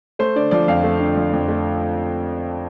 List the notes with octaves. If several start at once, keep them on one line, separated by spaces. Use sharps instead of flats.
A3 C5
D3 D5
F3 D5
F2 F5
A3
D3
F3
F2
A3